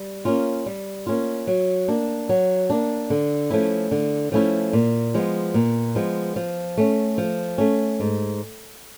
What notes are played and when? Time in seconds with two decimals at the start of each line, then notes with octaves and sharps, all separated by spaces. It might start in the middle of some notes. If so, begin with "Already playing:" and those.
Already playing: G3
0.25 A#3 C#4 F4
0.66 G3
1.07 A#3 C#4 F4
1.47 F#3
1.88 A#3 D4
2.29 F#3
2.70 A#3 D4
3.10 D3
3.50 F3 A3 C#4 E4
3.91 D3
4.32 F3 A3 C#4 E4
4.73 A#2
5.14 F3 G#3 B3
5.54 A#2
5.95 F3 G#3 B3
6.36 F3
6.78 A3 C#4
7.18 F3
7.58 A3 C#4
8.00 G#2